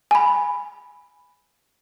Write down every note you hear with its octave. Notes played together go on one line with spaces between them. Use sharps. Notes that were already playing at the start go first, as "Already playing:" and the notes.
G#5 B5